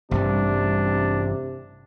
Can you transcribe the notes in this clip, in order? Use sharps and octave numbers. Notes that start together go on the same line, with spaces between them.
A1 G2 C3 G3 D4